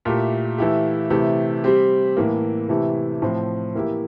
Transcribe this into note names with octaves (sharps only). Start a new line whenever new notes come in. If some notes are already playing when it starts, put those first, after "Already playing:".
A#2 A3 E4 G4
E3 A3 E4 G4
C3 E3 A3 E4 G4
G3 C4 G4
A2 E3 A#3
C3 E3 A3 E4 G4
A2 F3 C4
E3 A#3 E4 G4